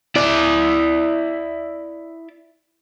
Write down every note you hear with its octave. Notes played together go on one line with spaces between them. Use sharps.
E4 D5